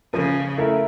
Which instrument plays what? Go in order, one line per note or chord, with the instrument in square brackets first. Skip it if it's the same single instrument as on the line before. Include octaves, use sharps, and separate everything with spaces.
[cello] C#3 [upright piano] F3
[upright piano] A3 E4 A#4 E5